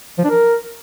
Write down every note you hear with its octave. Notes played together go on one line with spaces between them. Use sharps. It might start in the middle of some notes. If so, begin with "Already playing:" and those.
F3
D4
A#4